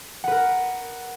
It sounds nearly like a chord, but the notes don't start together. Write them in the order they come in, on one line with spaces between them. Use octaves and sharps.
F#5 B4 A#4